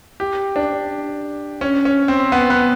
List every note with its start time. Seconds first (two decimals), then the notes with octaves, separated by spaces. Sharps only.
0.20 G4
0.56 D4
1.61 C#4
1.85 C#4
2.08 C4
2.32 B3
2.50 B3